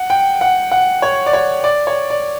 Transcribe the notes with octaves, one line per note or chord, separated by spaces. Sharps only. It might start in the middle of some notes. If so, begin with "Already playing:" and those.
Already playing: F#5
G5
F#5
F#5
C#5
D5
C#5
D5
C#5
D5